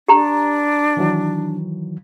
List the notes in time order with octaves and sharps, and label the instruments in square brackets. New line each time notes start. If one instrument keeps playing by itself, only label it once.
[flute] D4 [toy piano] G4 A#5
[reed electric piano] D#3 E3 F#3